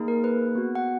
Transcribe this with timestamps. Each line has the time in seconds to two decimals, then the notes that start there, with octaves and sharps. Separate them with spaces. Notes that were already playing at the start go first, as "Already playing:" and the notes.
Already playing: A#3 D#4 G#4
0.08 A#4
0.24 B4
0.55 B3 F#4
0.75 F#5